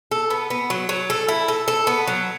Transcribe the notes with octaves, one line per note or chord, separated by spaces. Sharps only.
A4
B3
B3
F#3
F#3
A4
E4
A4
A4
B3
F#3